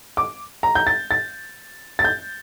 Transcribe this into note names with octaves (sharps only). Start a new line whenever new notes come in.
D6
A#5
G6
A6
A6
A6
G6